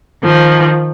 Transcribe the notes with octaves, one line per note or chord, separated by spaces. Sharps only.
D#3 F3